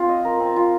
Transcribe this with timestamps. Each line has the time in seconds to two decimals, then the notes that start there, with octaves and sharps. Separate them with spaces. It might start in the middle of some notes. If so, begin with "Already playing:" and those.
Already playing: C4 F4
0.09 D#5
0.25 A#4
0.40 C4
0.56 F4